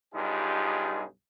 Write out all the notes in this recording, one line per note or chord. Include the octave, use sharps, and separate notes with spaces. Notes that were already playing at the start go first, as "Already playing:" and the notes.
B1 G2 D#4 F4 G4 G#4